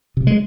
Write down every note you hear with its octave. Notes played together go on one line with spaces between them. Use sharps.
C3
G#3